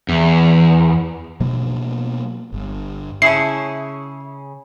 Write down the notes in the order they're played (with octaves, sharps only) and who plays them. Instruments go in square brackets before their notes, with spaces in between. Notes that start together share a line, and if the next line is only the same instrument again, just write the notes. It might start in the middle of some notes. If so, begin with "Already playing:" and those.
[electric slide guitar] E2
[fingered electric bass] B2 F#3 A#3
G1
[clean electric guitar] C#3 C#4 G#4 [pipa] A3 E4 [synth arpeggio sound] C7